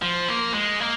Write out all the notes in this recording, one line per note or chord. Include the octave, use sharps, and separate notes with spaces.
F3
A#3
G#3
A#3